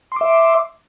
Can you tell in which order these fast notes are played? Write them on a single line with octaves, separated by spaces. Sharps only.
C6 D6 E5